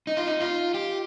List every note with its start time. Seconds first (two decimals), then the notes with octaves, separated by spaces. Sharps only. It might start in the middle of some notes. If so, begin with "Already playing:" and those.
0.07 D#4
0.17 F4
0.27 D#4
0.40 F4
0.74 G4